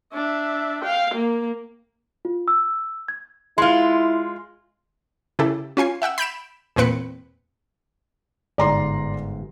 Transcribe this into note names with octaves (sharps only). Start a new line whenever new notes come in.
D4 E5
F5 G5
A#3
F4
E6
G#6
G#3 E4 F4 C6
C#3 E4 G4 A4
C#4 F4 G#5 C7
E5 F#5 G5 E6
B5 G6 D7 E7
E2 A#2 C4 B4 C#7
G1 G#2 D5 A#5 C6